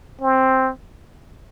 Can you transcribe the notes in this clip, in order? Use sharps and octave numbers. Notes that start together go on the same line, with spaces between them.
C4